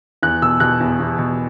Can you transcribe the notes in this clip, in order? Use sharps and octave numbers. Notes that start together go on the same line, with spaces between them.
E2 F#6
B2 E6
B2 F#6
E2
E2
B2